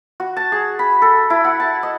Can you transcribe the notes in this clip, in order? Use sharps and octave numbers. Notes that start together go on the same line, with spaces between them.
F#4
A5
G#4
B5
A4
E4
F#5
A5
D#5